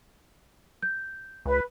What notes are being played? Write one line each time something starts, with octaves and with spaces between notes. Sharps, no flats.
G6
C#2 B4